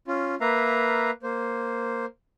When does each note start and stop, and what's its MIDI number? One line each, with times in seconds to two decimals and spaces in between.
0.07 0.35 61
0.07 0.35 65
0.41 1.11 58
0.41 1.11 71
0.41 1.11 76
0.41 1.11 77
0.41 1.11 82
1.23 2.06 58
1.23 2.06 72